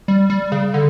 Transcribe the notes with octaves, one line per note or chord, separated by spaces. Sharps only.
G3
G3
C#3
D3